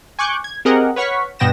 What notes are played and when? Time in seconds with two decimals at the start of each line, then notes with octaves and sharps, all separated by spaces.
0.19 G#5 C#6 D6 F#6 G6
0.44 G#6
0.65 C4 G4 G#4 A#4 D#5 F#5
0.96 B4 C#5 F#5 C#6 F6 B6
1.39 G2 B2 B3 G5 A#6 E7